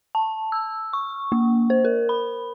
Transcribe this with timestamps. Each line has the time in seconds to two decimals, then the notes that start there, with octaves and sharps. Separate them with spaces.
0.15 A5
0.52 E6
0.93 C#6
1.32 A#3
1.70 C5
1.85 A#4
2.09 B5